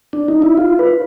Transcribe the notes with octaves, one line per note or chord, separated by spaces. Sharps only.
D4
D#4
E4
F4
B4